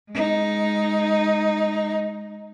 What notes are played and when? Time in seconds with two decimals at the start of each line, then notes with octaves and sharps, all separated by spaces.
0.11 G#3 D#4